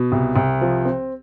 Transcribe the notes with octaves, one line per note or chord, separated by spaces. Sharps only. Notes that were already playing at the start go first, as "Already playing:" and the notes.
Already playing: B2
C2
C2
F3
C4